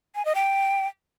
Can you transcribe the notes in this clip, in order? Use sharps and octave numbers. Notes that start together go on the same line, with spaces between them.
G#5
D#5
G5